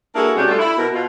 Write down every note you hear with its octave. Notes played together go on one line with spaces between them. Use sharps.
A#3 D4 E4 F#4 G#4 A4
C3 G#3 C#4 D4 F#4 G4
G3 A3 D4 F4 A4
E4
B2 A#4
B2 F4